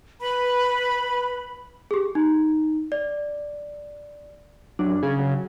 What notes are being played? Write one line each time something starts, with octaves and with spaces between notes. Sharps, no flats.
B4 B5
G4 G#4
D#4
D5
F#2 D4
C#3 G#4
F#3